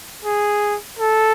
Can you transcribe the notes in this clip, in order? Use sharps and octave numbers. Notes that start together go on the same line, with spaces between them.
G#4
A4